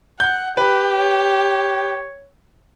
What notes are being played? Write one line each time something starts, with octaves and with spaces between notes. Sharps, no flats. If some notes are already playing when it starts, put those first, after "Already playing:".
F#5 G6
G4 B4
C#5